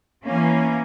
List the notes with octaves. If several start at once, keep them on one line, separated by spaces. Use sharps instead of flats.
E3 A#3 C#4